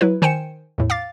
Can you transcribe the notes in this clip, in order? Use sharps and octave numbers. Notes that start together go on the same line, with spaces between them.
F#3 E4 B4
D#3 C5 G5 G#5 C#7 E7
E2 A2
F5 D6 A6